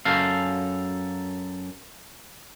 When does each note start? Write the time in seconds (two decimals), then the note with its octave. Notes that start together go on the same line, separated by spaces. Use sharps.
0.05 F#2 A4 F5